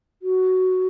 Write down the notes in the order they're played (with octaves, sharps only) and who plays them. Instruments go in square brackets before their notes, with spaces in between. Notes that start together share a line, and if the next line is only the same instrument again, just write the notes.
[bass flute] F#4